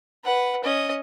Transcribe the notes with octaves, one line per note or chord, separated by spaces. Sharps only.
B4 F#5
C#4 D#5